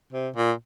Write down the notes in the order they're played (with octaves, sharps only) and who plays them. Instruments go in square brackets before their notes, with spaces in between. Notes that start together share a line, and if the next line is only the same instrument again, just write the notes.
[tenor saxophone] C3
A#2